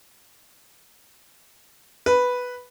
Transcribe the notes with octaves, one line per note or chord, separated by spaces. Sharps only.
B4